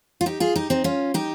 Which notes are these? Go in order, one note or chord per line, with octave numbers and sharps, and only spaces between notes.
F4
D#4 G4
F4 G#4
D#4 G4
C4 D#4
C#4 F4
D#4 G4